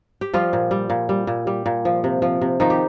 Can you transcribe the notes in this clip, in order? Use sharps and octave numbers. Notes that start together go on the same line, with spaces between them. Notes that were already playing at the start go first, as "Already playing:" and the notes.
G4
F3 G3 F4
A#2
G3
A#2
G3
A#2
G3
A#2
F3
C3
F3
C3
D#3 F3 D#4
G4